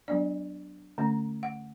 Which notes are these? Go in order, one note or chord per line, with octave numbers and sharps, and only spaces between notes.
F#3 B3 D4 D5
D3 A3 C#4
F#5